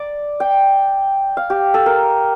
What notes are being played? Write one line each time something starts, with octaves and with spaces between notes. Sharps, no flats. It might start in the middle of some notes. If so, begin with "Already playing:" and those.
Already playing: D5
G5
F5
G4
A4
A#4